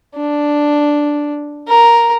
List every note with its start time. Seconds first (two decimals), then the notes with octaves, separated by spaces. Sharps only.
0.17 D4
1.68 A#4